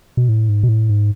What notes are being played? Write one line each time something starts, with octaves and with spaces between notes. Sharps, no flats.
B2
A2
G#2
B2
A2
G#2